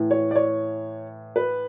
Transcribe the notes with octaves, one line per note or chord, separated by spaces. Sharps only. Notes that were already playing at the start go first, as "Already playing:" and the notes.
Already playing: A2 E3
C#5
D5
C#5
B4